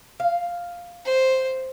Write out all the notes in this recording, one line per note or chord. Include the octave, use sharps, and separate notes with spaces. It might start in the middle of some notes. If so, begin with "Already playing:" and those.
F5
C5